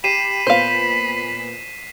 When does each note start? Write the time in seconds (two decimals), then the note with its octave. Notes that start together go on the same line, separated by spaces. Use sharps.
0.04 G4 B5 C7 D#7 E7
0.47 A#2 B3 C5 F5 B6